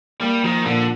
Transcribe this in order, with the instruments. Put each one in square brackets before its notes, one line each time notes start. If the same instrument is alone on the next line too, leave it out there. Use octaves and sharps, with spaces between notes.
[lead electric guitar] G3 [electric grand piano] A#3
[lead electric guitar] D#3 [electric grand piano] F3
[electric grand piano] A#2 [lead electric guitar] D3